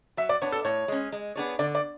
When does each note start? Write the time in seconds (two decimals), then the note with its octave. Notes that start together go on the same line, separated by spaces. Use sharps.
0.17 F#3 E5
0.29 D5
0.42 B3 D4 C#5
0.52 A4
0.65 A2 C#5
0.88 G#3 C#4
1.12 G#3
1.36 B3 D4 G#4 C#5
1.59 D3 D5
1.75 D5